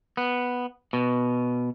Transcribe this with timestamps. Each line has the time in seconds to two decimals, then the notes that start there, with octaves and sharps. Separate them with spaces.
0.17 B3
0.93 B2